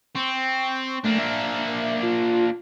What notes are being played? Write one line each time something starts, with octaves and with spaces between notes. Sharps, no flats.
C4 C#6
A3 A#3 D4
E5
F4